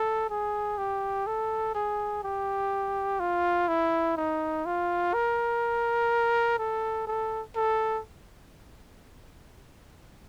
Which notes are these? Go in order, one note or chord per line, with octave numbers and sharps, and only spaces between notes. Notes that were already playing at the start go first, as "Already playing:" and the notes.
Already playing: A4
G#4
G4
A4
G#4
G4
F4
E4
D#4
F4
A#4
A4
A4
A4